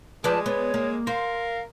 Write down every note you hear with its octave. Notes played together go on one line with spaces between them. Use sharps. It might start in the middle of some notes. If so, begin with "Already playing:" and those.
F3 G#3 B4 D5 A5
B3 C#5
A#3
A#4 C5 F5